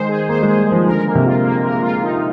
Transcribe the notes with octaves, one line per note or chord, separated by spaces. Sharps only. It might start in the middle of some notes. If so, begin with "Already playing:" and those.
Already playing: D#3 G#3 C5
G#4
A#3 C5
G#3
G#4
G3
F3 G#3
D3 A#4
A#3
C3
F4
A#3
A#4
F4
D#4